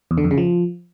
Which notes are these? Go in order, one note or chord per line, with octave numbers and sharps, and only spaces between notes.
E2
D3
F2
C#3
F3